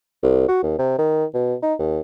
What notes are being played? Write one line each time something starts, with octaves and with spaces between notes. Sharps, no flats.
C2
F#4
D#2
C3
D#3
B2
D#4
D#2